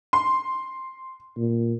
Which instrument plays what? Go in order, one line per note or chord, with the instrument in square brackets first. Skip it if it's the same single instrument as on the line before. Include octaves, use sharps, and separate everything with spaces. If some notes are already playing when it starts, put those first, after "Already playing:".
[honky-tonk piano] C6
[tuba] A#2